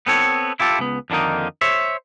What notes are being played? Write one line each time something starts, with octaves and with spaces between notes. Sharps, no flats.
B3 C4 A4 C#5
E4 F4 G4 A4
C#2 B3
F2 D3 D#3 A#3 D#4
C5 C#5 E5